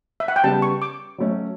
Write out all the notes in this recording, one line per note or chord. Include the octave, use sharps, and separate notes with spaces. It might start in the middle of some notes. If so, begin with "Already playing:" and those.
E5
F#5
G5
C#3 G3 B3 A5
C#6
D6
F#3 A3 C#4